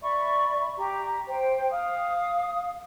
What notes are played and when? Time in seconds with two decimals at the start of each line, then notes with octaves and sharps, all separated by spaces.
0.01 D5 E5 B5 C#6
0.77 G4 A#5
1.27 C5 G5
1.71 F5 D#6